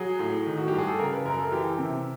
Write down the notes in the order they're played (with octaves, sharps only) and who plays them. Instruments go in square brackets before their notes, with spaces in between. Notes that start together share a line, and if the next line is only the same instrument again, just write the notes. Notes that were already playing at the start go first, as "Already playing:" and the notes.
Already playing: [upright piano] F#3 [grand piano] G#4
[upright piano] A2
D#3
[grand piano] F#4
[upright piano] G2 [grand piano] G4
[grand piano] G#4
A4
[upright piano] C#3 [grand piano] A#4
[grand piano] B4
[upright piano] F#2 [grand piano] A#4
[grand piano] A4
[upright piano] E3 [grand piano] G4
[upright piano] C3